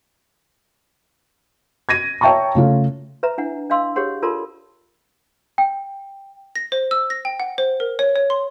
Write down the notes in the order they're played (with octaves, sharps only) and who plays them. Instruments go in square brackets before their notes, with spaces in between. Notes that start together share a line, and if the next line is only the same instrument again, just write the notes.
[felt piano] G#6 A#6 D#7
C#5 E5 G5 A5 A#5 C#6
C#3 A3 F4
[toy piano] B4 E5 A#5
D4 E4 F#5
D4 D#5 F5 C6 E6
G4 G#4 C#5 F#5 C6
F4 A4 A#4 D5 A5 C6
[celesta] G5
[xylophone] A#6
C5
E6
A#6
G5
F#5
C5
A#4
C#5
C#5
C6